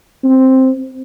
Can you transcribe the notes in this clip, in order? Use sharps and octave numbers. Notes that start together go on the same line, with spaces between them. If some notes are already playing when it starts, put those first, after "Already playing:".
C4